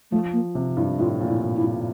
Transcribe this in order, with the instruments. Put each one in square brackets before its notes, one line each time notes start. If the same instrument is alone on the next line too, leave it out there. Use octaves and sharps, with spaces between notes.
[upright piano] F3 [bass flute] A3
[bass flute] A#3
[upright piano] C3
[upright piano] G2 [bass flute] E4
[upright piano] A2 [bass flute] F4
[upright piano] A#2
[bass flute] E4
[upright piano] A#2
[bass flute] E4
[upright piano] A2